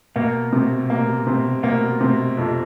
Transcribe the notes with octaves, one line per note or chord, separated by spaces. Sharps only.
B2 A#3
C3
A#3
C3
B2 A#3
C3
F2